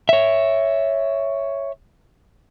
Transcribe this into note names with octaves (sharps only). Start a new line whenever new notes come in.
C#5 E5